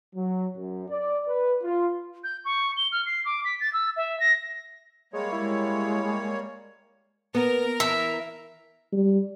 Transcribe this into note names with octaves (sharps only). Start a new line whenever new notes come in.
F#3
F#2
D5
B4
F4
G6
C#6
G7
F6
C7
D6
B6
A6
E6
E5
A#6
G3 G#3 A#3 C#5
G#3 E4
B3 A#4
E3 E5
G3